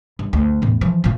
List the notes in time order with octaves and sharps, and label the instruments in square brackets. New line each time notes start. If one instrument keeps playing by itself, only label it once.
[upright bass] G2
D2
E2 A2
E3 F3
A#2 F4